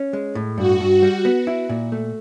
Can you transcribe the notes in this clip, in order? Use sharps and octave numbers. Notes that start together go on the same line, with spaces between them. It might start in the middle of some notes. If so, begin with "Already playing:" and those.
Already playing: C#4
G#3
A2
G2 F#4
G2
G3
B3
E4
A#2
A3